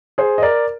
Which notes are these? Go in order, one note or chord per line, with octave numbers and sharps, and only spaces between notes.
G#4 C5
D#5
A#4 D5